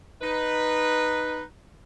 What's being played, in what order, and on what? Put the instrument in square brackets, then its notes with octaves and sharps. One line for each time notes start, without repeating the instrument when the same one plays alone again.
[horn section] D#4 B4